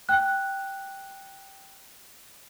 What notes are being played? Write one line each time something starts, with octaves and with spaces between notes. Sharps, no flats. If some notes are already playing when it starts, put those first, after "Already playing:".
G5 F#6